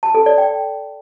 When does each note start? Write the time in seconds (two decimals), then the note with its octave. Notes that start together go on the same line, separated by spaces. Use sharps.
0.03 A5
0.15 A4
0.26 D5
0.38 G5